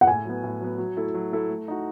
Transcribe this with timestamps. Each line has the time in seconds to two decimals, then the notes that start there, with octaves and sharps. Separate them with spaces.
0.01 F#5
0.07 A2 G#5
0.25 F#3 B3
0.44 A2
0.61 F#3 B3
0.78 F#3
0.97 A3 E4 A4
1.15 F#3
1.32 A3 E4 A4
1.50 A3
1.68 D#4 F#4